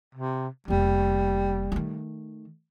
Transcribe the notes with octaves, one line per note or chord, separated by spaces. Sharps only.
C3
F1 G3 A#3
D#3 A3